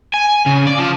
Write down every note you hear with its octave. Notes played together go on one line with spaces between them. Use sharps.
G#5
C#3
D5
F3